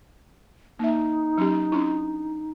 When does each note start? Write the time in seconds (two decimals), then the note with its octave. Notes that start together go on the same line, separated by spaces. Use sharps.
0.79 A#3 D#4 E5
1.38 F#3 C#4 G4
1.72 C#4 D4 E4